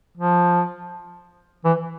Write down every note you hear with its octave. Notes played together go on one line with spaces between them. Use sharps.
F3
E3